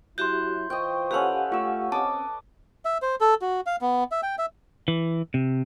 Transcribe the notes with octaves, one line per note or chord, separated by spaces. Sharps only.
F#3 E4 F#4 G4 E5 C6 G6
E3 F4 C5 D#5 G5 C#6
C#4 G4 A4 B4 F5 F#5
A3 F4 C#6 E6
C4 C#4 D#5 A5 D6
E5
C5
A4
F#4
F5
B3
E5
G5
E5
E3
C3